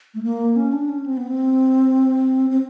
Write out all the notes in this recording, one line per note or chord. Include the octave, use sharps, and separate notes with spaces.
A3
A#3
C#4
D4
C#4
C4
B3
C4
C4